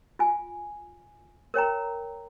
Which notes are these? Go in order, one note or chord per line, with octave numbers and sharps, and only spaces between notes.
F4 G#5
A#4 C#5 G5 A#5